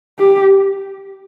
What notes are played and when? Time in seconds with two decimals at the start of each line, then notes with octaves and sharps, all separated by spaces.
0.19 G4